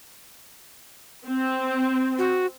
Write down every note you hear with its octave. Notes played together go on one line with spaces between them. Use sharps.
C4
F#4